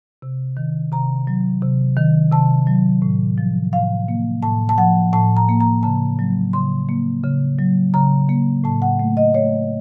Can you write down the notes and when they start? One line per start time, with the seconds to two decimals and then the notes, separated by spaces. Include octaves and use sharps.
0.22 C3
0.57 D#3
0.92 C3 A#5
1.27 F#3
1.62 C3
1.97 D#3
2.32 C3 A5
2.67 F#3
3.02 A2
3.38 F3
3.73 A2 F5
4.08 A#3
4.43 A2 A5
4.69 A5
4.78 F3 F#5
5.13 A2 A5
5.37 A#5
5.49 A#3
5.60 A#5
5.83 C#3 A5
6.19 F#3
6.53 C#3 C6
6.89 A#3
7.23 C#3
7.59 F#3
7.94 C#3 A#5
8.29 A#3
8.64 A2 A5
8.82 F#5
8.99 A3
9.17 D#5
9.34 A3 C#5